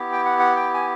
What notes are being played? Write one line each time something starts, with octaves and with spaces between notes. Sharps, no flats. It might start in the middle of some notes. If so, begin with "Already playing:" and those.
Already playing: B3 E4 G4
G5
F#5
F#5
G5
G#5